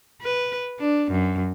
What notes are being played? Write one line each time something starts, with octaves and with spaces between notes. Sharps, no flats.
B4
D4
F#2